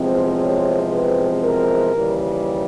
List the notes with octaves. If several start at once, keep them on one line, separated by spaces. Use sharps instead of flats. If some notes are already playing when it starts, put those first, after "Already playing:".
Already playing: E2 C3 F3 G#3 C4
C#5
B4
A#4
D#2 C#3 E3 G3